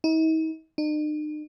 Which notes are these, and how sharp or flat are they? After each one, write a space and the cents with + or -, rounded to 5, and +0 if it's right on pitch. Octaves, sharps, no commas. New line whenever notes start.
D#4 +45
D#4 -45